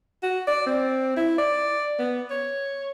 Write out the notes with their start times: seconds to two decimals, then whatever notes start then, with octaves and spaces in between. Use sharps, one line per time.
0.22 F#4
0.47 D5
0.66 C4
1.16 E4
1.38 D5
1.99 B3
2.30 C#5